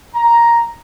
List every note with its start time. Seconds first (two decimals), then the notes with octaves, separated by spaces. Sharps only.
0.14 A#5